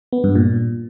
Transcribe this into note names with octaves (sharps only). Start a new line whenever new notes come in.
B3
G2
A#2